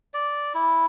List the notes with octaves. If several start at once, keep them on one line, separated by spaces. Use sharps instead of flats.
D5
E4